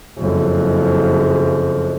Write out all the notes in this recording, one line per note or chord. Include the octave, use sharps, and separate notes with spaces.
F#1 F2